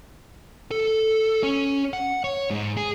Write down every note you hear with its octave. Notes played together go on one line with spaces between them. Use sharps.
A4
C#4
F#5
C#5
G#2
G#4